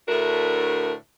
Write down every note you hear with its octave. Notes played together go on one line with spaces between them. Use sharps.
D2 A2 A3 D4 F#4 A#4